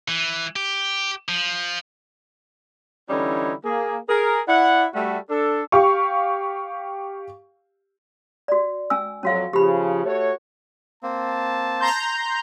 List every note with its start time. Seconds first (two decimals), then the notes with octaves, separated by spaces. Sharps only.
0.09 E3
0.56 G4
1.28 F3
3.09 D3 E3 G3 C#4 D#4 E4
3.65 A#3 G#4
4.08 G#4 A#4
4.47 E4 D5 F#5
4.94 G3 A3 F#4
5.29 D4 A4
5.72 G4 F5 C#6
8.48 F#4 D5
8.90 C#4 G#5 E6
9.23 F2 F#3 C#4 F#4 F5
9.53 C#3 F3 G4 B5
10.04 A3 F#4 C#5
11.03 A#3 C4 A5
11.80 A#5 C6 G6